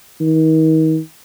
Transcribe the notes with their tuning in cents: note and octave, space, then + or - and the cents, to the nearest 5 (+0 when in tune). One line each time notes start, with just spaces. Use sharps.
D#3 +35